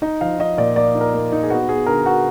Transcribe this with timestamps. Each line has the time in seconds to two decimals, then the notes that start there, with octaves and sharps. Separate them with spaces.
0.02 D#4 D#5
0.21 F3 F5
0.39 D#4 D#5
0.58 A#2 D5
0.76 A#3 D5
0.95 D#4
1.01 A#4
1.13 A#3
1.32 D#4
1.43 G#4
1.50 B3 F#4
1.69 B3 G#4
1.86 D3 A#4
2.06 B3 F#4